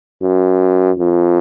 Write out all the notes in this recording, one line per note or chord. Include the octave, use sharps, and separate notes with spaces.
F#2
F2